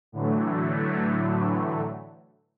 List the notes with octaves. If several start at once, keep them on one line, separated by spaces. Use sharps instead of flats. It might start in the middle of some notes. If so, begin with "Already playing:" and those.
A2 D3 E3 F#3 A3